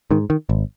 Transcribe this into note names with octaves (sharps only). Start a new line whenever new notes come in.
G#2 D#3
D#3
G#1